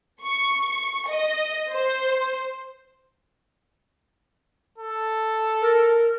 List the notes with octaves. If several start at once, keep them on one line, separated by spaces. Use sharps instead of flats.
C#6
D#5
C5
A4
A#4